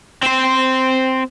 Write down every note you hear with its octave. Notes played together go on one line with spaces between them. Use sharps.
C4 C5